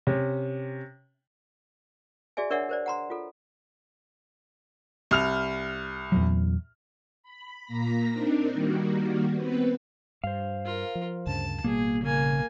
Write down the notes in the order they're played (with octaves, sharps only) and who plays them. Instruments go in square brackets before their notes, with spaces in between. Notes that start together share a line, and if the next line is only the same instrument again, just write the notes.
[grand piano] C3 C#4
[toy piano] F#4 G#4 D5 E5 G#5
D4 A#4 C#5 D5 E5 F#5
A#4 C5 D5
F#5 A#5 C6
F4 A4
[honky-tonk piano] C2 F6 F7
[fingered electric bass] E2 A#2 F#3
[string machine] B5
A#2 A#3 A#5 A#6 B6
C4 D4 D#4 A#4
D#3 G3 A#3 F#4
B3 C4 B4
[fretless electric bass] G2 [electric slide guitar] C5 F5
[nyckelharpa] F4 A#4
[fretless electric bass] F3
[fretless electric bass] D2 G2 C#3 [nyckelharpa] A5
[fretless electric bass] A1 B2 G3 [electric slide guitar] A#3 [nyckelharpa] G#4
[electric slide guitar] C#3 [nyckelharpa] A#3 G#5